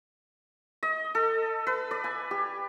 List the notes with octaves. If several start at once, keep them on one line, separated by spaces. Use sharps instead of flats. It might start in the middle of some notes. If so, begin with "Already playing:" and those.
D#5
A4
B4
D5
G#5
G4